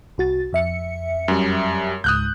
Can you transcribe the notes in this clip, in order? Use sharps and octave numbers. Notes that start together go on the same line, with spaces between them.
C2 F#4 A6
F2 E5 C#7
F#2 G3
C#2 G#2 D#6 F#6 G6